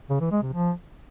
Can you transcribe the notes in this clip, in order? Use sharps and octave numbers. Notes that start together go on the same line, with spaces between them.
C#3
E3
G#3
C3
F3